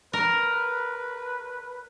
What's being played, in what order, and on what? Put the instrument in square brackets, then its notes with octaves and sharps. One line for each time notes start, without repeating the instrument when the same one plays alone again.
[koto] A#4 [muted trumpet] B4